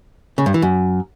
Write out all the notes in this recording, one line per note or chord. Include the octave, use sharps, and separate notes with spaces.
C#3
G2
E3
F#2